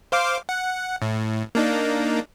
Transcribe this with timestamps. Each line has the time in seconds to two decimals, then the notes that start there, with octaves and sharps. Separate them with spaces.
0.12 C5 F5 D6
0.49 F#5
1.02 A2
1.55 A#3 D4 D#4